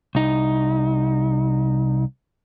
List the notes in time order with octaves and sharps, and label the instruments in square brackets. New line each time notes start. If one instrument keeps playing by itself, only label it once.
[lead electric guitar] C2 D#4